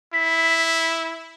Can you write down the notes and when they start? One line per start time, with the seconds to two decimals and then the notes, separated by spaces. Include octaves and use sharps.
0.14 E4 B6